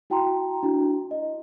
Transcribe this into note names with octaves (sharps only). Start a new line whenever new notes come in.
E4 F#4 G5 A5 A#5 C6
D4 E4 F#4
D#5